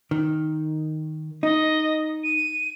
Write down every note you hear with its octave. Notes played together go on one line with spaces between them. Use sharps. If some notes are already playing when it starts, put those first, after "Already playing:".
D#3
D#4 D#5
D#7